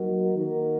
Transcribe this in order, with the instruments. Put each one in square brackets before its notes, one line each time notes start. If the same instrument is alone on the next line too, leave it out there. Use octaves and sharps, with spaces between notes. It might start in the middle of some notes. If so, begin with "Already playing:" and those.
Already playing: [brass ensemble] F#3 A#3 D#4 F#4 A#4
D#3 A#3 D#4 F#4 A#4